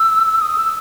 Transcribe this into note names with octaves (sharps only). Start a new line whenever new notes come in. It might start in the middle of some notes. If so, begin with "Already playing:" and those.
Already playing: E6
D#6
E6